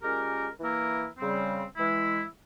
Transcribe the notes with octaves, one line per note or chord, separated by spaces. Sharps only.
A#2 G#3 C#4 G4 A#4
E3 A#3 E4 A#4
C#3 G3 C4
E3 G#3 E4